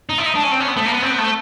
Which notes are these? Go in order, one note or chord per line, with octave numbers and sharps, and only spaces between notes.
D#4
E4
D#4
D4
C#4
C4
C#4
B3
A3
A#3
B3
C4
B3
A3